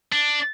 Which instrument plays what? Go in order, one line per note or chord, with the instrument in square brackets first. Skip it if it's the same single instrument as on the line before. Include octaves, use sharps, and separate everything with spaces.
[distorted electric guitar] D4